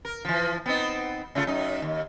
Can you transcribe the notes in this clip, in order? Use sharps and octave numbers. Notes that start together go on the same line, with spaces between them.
A#4
E3 F3
B3 C4 D#4
C#3 A3 F4
F#2 D#4
D#2